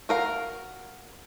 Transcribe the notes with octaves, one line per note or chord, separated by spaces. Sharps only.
F#4 A#4 F5